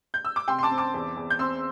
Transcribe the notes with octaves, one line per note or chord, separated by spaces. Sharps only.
G6
E6
D6
C3 G5 C6
C6
A5 D6
C4
A5 D6
E2
E2
G6
C4 C6 E6